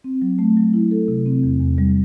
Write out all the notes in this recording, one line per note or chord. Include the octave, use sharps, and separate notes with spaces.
C4
F#3
A3
F#3
E4
A4
C3
C4
E2
E2
G3